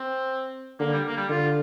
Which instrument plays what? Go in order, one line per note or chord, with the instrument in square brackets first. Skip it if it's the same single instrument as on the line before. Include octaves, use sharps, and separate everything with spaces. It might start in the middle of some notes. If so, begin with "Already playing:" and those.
Already playing: [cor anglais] C4
[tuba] D3 [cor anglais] A#3
[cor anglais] G3
A#3
G3
[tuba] D3 [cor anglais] F4